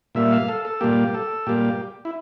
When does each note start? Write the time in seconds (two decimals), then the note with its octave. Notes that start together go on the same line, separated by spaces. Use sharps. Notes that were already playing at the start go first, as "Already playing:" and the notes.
0.15 A#2 G3 A#3 E5
0.32 F5
0.48 A4
0.65 A4
0.81 A#2 G3 A#3 G4
1.14 A4
1.47 A#2 G3 A#3 G4
2.05 E4